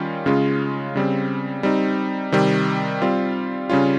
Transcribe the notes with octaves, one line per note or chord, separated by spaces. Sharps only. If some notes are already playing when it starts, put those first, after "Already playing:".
Already playing: D#3 G3 C#4 F4
C#3 G#3 C#4 F4
C#3 G3 C4
G3 C4 D#4
C3 D#3 G3
G3 C4 F4
C#3 G3 C#4 F4